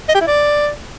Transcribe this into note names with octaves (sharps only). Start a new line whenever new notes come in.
D#5
G4
E4
D5